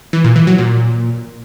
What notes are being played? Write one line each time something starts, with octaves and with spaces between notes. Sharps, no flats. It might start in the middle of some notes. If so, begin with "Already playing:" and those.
E3
A#2
E3
F#3
A#2